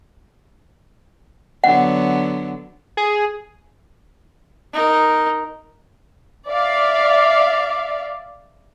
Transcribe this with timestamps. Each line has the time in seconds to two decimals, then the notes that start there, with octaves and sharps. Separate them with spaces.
1.64 D3 F#3 B3 F#5
2.97 G#4
4.73 D#4 A#4
6.48 D5 E5 F5